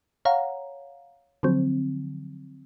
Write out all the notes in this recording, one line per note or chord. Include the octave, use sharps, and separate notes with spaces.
C#5 F5 F#5 A#5
D3 F3 F#3 C4